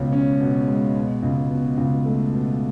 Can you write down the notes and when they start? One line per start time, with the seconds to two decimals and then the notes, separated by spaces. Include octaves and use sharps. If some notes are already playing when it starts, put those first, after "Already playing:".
Already playing: C#2 B2 C#4
0.12 C#4
0.40 B2
0.68 G#3
0.95 B2
1.22 C#2
1.50 B2
1.77 C#2
2.06 A3
2.33 B2